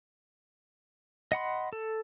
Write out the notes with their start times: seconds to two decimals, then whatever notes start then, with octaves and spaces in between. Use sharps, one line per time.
1.32 D#5 F#5 B5 C6
1.73 A4